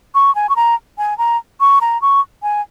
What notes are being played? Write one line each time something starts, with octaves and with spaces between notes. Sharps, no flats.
C#6
G#5
C#6
A#5
G#5
A#5
C#6
A#5
C#6
G#5